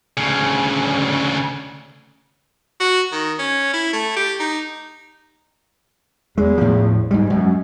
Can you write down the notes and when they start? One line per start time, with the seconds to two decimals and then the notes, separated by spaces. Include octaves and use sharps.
0.17 D2 C#3
2.80 F#4
3.12 D#3
3.39 C#4
3.73 E4
3.93 A3
4.16 G4
4.39 D#4
6.38 E2 G#3
6.58 A2 F3
7.11 G#2 G3 G#3
7.30 F#2